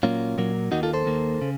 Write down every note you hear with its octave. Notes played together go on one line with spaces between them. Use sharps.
A#2 F#3 A#3 C#4 F4
A#2 F#3 A#3
D#2 D#3 A#3 D#4 F#4
F4 A4
A4 C5
D#2 D#3 A#3
C#3